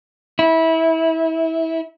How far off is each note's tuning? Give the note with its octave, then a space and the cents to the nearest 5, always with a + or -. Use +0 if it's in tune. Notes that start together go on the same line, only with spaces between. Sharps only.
E4 -25